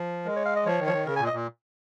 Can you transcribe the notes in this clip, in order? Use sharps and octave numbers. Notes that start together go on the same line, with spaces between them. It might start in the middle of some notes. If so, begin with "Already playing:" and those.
Already playing: F3
G#3 A#4
C#5
F5
D#5
F3 C#5
D#3
F3 C#5
D#3
C#3 A#4
A#2 G#5
D#5
A#2